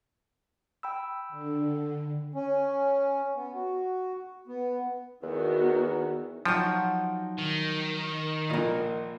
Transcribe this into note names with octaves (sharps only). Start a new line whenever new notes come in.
G5 B5 E6
D3
C#4
B3
F#4
B3
E2 D#3 B3 F#4
F3 F#3 D#4 F#5 G5 C#6
D#3
A#1 A#2 A#4 D#5